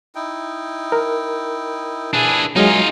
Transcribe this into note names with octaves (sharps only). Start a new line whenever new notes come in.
D#4 E4 G5
A#4
D4 E4 G#4 B4 G#5
F#3 G#3 D#4 F4 G#4 A#4 G#5